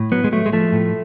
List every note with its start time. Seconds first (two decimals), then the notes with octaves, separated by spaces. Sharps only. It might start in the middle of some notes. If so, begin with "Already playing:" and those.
Already playing: A2
0.12 F#3 B3
0.24 G#3
0.32 F#3 A3
0.46 G#3
0.53 F3 A3
0.73 A2